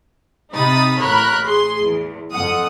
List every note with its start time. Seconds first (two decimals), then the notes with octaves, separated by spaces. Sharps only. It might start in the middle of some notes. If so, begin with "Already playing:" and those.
0.52 C3 D#4 B5 D#6 A6
1.00 A1 A#4 C#5 B5 F#6
1.45 G#4 C6
1.80 E2
2.33 F2 F#5 D#6